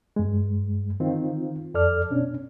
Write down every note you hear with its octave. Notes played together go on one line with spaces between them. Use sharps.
G2 G#3
D#3 C4 F4
F2 A4 D5 F6
B2 C#4 D4